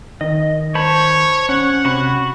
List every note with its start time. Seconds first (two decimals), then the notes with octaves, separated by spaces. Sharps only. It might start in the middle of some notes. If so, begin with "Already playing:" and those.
0.21 D#3 D#5
0.75 C5 C#5 A5 B5
1.49 C#4 F#5
1.85 C3 F#4 B5 C#6